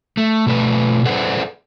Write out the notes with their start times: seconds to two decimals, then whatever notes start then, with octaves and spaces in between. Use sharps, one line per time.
0.17 A3
0.47 B2 A3 B4
1.05 G#4 A4 B4 C5 D5 F#5